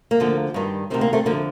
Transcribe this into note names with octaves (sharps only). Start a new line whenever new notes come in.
A#3
D2 D3 F3
G2 D#3 G3
D2 C3 D#3 G3 C4
A#3
A3 C4
F2 D3 F3 A#3